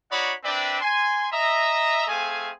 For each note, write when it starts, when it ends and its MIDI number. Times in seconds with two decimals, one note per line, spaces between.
0.11 0.33 63
0.11 0.33 66
0.11 0.33 73
0.11 0.33 74
0.11 0.33 78
0.11 0.33 83
0.44 0.78 60
0.44 0.78 62
0.44 0.78 71
0.44 0.78 74
0.44 0.78 76
0.44 0.78 79
0.81 1.28 80
0.81 1.28 84
1.32 2.05 75
1.32 2.05 76
1.32 2.05 82
2.07 2.51 57
2.07 2.51 60
2.07 2.51 68
2.07 2.51 77
2.07 2.51 80